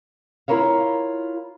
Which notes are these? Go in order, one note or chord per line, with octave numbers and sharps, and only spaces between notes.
E4 F4 A#4 C#5 F5